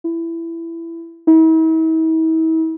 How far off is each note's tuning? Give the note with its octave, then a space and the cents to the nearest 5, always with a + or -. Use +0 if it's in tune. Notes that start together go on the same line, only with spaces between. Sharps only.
E4 +15
E4 -45